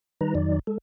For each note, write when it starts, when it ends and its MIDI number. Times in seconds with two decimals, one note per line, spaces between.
0.21 0.34 51
0.21 0.34 55
0.21 0.34 63
0.21 0.34 71
0.21 0.34 82
0.35 0.59 41
0.35 0.59 51
0.35 0.59 54
0.35 0.59 63
0.35 0.59 74
0.67 0.78 56
0.67 0.78 69